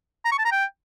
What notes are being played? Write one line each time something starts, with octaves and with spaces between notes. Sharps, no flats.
A#5
C#6
A5
A#5
G5